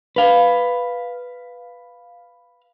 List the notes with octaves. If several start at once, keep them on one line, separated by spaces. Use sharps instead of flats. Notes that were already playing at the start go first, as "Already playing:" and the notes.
B4 F5